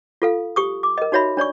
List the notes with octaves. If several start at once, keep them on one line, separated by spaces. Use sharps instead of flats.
F4 A4 F5
G4 C#6 D#6
D6
A#4 D#5
D#4 F#4 C#5 E5 B5
D4 C#5 D5 C#6